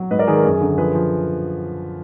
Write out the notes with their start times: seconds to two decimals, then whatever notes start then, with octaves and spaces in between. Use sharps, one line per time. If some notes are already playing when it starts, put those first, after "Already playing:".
Already playing: F#3
0.11 G#2 B4 D#5
0.19 A#4 D5
0.27 D#3 G#4 B4
0.36 A#4
0.44 F#2 G#4
0.61 D3
0.78 F3 G#4 B4
0.95 F3